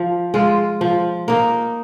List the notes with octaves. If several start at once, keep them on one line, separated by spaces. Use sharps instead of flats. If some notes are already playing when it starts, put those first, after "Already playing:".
Already playing: F3
G#3 F4
F3
A#3 D#4